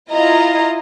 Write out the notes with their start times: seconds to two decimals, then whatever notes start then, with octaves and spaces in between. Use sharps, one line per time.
0.11 E4 F4 D#5 A#5